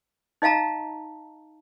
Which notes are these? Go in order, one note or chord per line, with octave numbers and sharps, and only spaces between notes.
D#4 D#5 F5 A5 A#5